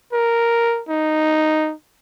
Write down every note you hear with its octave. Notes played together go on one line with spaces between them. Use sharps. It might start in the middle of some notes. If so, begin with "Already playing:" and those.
A#4
D#4